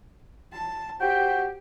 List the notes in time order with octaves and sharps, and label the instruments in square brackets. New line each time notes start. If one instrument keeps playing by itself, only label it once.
[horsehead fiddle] A5
[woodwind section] F#4 C5 G5 [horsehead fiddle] G4